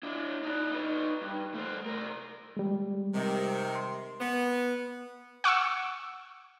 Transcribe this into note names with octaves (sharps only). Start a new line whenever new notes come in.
D4 E4
D#4 D5
D#4 B4
G2
A3 C5
C3 A#4
G3 G#3
C3 D#3
C6
B3
F#5 C#6 D6 E6